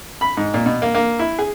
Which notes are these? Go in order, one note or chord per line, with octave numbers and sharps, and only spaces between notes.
B5
G#2
A#2
B2
A#3
A#3
E4
G#4